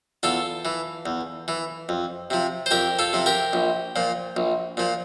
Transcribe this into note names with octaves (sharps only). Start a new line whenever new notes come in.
E2 F4 A4
E3
E2
E3
F2
C3 F3
C5
F2 G4 A#4
F4 A4
C3 F3
G4 A#4
A#1
A#2 F3
A#1
A#2 F3